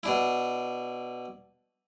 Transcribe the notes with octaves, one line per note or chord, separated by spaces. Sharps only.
B2 D4 E4